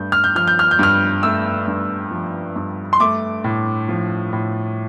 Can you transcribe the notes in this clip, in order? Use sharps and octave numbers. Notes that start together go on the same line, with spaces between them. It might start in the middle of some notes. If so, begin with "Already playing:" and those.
Already playing: G2 A3 G6
F6
G6
F3 F6
G6
F6
G6
G2 F6
A3 E6
G2
F3
G2
C6
A3 D6
A2
F3
A2